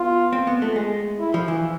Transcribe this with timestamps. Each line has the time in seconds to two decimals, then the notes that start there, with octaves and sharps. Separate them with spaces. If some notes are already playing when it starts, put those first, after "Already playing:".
Already playing: B3 F4
0.33 C4
0.47 B3
0.62 A3
0.76 G#3
1.19 E4
1.34 F3
1.48 E3